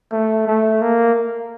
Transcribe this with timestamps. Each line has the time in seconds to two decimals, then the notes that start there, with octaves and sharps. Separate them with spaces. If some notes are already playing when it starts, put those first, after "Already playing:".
0.12 A3
0.47 A3
0.81 A#3